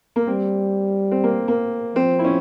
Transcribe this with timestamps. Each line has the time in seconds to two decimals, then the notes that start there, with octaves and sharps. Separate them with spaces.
0.16 A#3
0.27 G3 C4
1.11 C4
1.24 A#3
1.48 A#3
1.96 F3 C4
2.19 E4
2.24 C#4